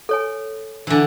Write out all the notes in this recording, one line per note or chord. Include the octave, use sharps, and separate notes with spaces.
A4 C#5 G#5
D3 E3